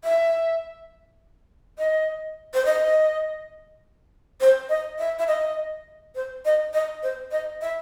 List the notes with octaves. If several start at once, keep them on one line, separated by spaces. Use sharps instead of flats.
E5
D#5
C5
D#5
C5
D#5
E5
E5
D#5
C5
D#5
D#5
C5
D#5
E5